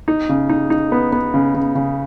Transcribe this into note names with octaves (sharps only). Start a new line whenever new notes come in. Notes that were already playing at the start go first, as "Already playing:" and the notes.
D#4
C#3
D#4
D#4
B3
B3
C#3
C#3
C#3